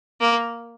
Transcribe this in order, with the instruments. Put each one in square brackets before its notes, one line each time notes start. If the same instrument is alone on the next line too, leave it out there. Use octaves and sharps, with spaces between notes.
[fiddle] A#3